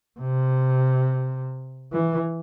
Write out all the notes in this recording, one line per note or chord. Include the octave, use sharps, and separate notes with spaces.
C3
E3